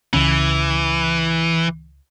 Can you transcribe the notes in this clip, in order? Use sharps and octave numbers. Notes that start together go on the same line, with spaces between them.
C#2 C#3 E3 C#4